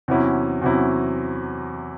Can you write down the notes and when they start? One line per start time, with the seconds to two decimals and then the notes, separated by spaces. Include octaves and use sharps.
0.08 E2 C3 F#3 C#4 E4
0.61 E2 C3 F#3 C#4 E4